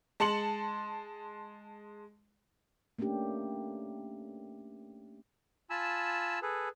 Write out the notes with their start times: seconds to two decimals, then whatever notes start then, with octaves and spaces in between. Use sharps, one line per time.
0.20 G#3 A5 C6 C#7 F#7
2.98 A3 A#3 C#4 D4 G4
5.70 F4 G#5 A5 B5 E6
6.42 G#4 A4 B4